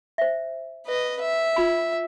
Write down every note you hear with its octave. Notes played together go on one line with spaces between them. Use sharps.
C5 E5
B4 D#5
E5
F4 B5